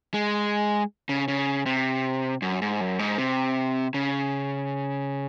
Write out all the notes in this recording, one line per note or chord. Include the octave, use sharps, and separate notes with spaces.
G#3
C#3
C#3
C3
F#2
G#2
F#2
G#2
C3
C#3